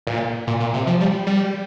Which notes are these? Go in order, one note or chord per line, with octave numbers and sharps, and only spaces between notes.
A#2
A#2
A#2
C3
F3
G3
G3